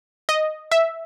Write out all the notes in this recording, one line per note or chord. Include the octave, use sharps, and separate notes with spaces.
D#5
E5